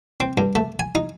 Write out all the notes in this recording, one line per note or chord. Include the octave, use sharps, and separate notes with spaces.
C4
G2
A3
G#5
D#4